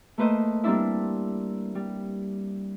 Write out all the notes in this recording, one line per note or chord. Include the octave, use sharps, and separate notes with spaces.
A3 A#3 B4 C5 D#5
G3 A#3 C4 D4 E4
G3